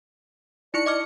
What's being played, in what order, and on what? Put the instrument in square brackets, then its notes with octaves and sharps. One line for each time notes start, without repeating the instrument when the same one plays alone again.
[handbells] D#4 E4 C#6 [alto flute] D5 [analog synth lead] C#7
[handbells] D#5 D6 F6